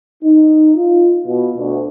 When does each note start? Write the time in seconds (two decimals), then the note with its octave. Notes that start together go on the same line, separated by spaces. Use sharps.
0.23 D#4
0.76 F4
1.27 B2
1.58 D2